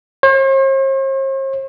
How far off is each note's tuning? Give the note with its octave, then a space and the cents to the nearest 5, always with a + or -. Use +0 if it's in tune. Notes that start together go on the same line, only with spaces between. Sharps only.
C5 +45